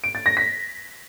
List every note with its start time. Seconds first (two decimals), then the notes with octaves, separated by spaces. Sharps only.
0.04 D7
0.15 A6
0.26 A#6
0.37 B6